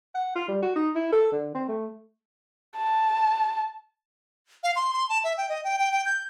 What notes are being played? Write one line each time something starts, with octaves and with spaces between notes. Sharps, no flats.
F#5
F4
G3
F#4
D#4
E4
A4
D3
C4
A3
A5
F5
C6
C6
A5
E5
G5
D#5
G5
G5
G5
G6